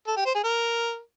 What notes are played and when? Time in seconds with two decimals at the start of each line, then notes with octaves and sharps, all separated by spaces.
0.07 A4
0.16 G4
0.26 C5
0.35 G#4
0.44 A#4